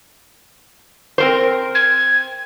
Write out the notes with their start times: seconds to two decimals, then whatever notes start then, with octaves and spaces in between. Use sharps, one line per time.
1.18 C4 A#4 C5
1.75 G#6